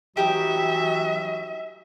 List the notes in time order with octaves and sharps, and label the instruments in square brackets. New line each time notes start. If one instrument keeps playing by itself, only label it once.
[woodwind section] E3 F#3 F#4 [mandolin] D#4 G4 [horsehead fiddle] E5